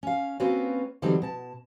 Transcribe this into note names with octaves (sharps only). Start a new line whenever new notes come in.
C#4 F5
A#3 C4 C#4 F4 F#4 B4
D3 E3 F#3 G3 C4 D#4
B2 A5